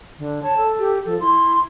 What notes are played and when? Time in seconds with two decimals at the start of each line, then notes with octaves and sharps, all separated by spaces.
0.19 D3
0.43 C#5 A5
0.57 A4
0.79 G4
1.06 F3 A4
1.20 E4 C6